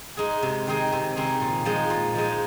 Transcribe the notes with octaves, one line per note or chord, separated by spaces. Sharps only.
G#3 D#4 G#4
C3
D#3 C4 D#4 G#4
C3
D#3 C4 D#4 G#4
A#2
F3 G#3 D#4
A#2
F3 G#3 D#4